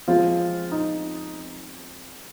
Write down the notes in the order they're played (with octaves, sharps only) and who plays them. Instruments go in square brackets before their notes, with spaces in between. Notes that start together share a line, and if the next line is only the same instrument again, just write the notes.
[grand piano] F3 G#3 C4 [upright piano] F4
[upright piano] D#4